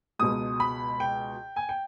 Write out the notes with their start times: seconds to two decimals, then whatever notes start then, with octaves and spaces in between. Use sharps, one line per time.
0.19 C#2 B2 G#3 D#6
0.60 B5
1.00 G5
1.56 G#5
1.69 G5